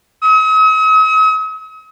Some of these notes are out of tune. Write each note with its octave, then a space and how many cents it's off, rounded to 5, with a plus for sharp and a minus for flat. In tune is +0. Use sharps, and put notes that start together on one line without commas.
D#6 +45